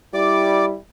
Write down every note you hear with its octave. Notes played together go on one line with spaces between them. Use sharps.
G3 E4 D5 D6